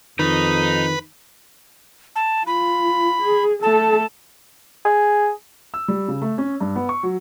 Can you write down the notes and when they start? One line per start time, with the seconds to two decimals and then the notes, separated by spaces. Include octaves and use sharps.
0.19 F2 D#3 D#4 B4
2.16 A5
2.47 F4 B5
3.22 G#4
3.63 A3 A4 A5
4.85 G#4
5.74 E6
5.88 G3
6.08 C#3
6.22 A3
6.38 C#4
6.61 G2
6.76 B3
6.89 C#6
7.03 F#3